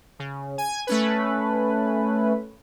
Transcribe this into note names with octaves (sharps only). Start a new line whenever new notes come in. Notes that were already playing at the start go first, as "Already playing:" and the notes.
C#3
G#5
A3 C#4 B4